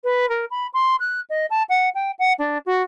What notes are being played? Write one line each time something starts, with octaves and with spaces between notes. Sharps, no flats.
B4
A#4
B5
C6
F#6
D#5
A5
F#5
G5
F#5
D4
F#4